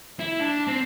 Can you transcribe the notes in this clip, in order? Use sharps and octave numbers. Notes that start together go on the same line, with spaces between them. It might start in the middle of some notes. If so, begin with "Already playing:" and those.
E4
D4
C4